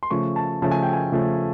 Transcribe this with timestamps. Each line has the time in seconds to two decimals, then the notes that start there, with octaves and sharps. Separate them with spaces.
0.03 C6
0.10 C#3 F3 A3 C#6
0.36 A5
0.62 C#3 F3 A3 A5
0.71 G#5
0.83 G5
0.93 G#5
1.12 C#3 F3 A3